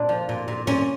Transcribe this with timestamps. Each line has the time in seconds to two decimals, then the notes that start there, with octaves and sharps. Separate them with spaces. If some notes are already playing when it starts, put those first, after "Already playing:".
Already playing: A#2 D4
0.09 F3
0.29 A#2
0.48 A#2
0.67 A#2 C#4